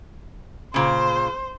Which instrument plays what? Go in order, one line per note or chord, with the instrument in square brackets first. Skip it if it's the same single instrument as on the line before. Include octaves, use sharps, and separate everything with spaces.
[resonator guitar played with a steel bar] A#2 C#3 [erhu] C5